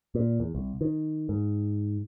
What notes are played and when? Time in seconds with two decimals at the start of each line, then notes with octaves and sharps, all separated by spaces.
0.15 A#2
0.40 E2
0.55 C2
0.81 D#3
1.29 G#2